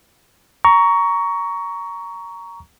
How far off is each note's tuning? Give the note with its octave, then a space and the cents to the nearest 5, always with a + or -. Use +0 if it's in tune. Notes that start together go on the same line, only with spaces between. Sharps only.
A#5 +0 C#6 +20